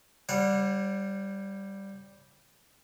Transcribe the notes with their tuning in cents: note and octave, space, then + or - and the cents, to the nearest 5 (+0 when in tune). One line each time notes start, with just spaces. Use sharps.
G3 +0 C#5 -40 F#5 -20